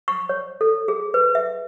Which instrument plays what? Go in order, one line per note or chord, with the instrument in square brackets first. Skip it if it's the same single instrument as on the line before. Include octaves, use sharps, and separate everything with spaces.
[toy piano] C#6
C#5
A4
G#4
B4
E5